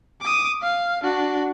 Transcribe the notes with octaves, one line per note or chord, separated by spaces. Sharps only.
D6 D#6
F5
D4 F#4